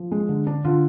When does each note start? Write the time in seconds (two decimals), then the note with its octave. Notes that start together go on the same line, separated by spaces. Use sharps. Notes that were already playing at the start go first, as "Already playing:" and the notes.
Already playing: F3
0.12 G#3
0.29 D3
0.47 D3 D4
0.64 D3 F4